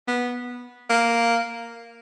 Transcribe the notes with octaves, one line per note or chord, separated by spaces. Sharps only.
B3
A#3